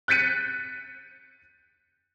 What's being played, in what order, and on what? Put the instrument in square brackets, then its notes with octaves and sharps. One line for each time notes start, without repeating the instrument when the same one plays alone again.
[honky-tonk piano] F#6 G6 A6 B6 C#7 D#7